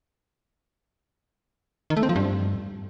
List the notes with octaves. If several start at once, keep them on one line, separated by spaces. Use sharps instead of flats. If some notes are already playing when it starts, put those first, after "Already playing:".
D#3
A3
C4
F3
G2